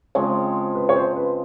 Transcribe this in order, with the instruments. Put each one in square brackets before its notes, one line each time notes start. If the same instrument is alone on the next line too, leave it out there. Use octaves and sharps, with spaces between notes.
[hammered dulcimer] C#3 F3 G#3 C4 [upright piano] C#5
[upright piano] B4
C#5
C5
B4